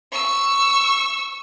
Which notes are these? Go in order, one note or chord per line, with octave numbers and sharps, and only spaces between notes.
C#6 E6